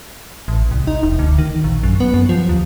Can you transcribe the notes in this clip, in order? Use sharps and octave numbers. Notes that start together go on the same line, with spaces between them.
A1
C2
D#4
E1
D2
D#3
A#1
F#2
B3
F#2
F3
D#2